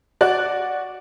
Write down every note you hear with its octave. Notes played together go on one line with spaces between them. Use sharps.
F#4 D5 F#6